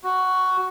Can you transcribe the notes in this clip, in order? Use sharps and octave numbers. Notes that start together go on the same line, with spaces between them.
F#4